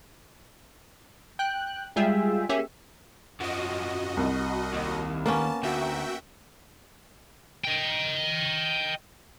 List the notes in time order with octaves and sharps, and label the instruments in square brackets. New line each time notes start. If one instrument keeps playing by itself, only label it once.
[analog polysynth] G5 F#6
G3 G#3 F4 G#4 E5 G5
A#3 C#4 G4 G#4 E5
[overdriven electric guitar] F#2 F3 [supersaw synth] F#4 D#5
[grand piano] C2
[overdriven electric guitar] D#2
[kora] A#3 B3 C#4 [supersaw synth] A5 [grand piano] A#5
[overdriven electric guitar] D2 [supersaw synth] F#4 E5 G5
[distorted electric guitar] D#5 G5